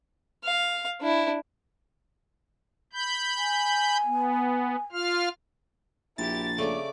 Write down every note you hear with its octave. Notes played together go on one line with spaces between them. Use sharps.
F5
D4 E4
B5 G6
G#5
B3
F4 F5 F6
A#1 E4 G4 A6
C#3 A3 D5 D6